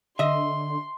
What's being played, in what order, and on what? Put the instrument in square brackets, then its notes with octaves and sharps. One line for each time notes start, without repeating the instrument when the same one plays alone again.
[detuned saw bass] D3 [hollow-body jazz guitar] D#5 E5 [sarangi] C6